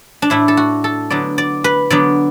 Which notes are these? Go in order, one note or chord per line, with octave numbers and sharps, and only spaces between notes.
D4
A2 A3 E4
A4
F#4
A4
D3 F#3 B3 D5
D5
B4
D3 F#3 B3 D5